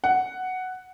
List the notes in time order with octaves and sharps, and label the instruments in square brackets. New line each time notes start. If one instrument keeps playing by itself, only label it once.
[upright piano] F#5